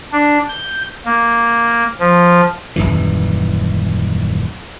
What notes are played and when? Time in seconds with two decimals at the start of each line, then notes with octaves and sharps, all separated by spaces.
0.12 D4
0.48 G6
1.06 A#3
2.00 F3
2.76 D#1 A1 F#2 E3